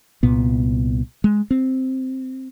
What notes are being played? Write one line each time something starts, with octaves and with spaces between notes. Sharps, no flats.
C2 A#2 B3
G#3
C4